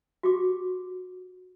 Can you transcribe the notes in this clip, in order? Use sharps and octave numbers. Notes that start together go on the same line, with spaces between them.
F#4 G4 D6